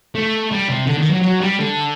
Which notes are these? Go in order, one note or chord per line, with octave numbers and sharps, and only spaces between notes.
A3
G3
C3
D3
D#3
F#3
F#3
G3
D3